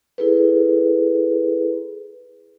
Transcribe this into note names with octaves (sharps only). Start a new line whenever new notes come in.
E4 G#4 A4 B4